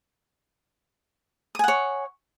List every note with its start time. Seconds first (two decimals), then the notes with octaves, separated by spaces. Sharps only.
1.55 D#6
1.59 G#5
1.64 F#5
1.68 C#5